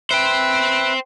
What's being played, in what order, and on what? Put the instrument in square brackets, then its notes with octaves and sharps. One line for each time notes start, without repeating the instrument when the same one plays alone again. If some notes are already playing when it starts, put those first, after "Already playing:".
[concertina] B4 E5 [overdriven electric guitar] C5 G5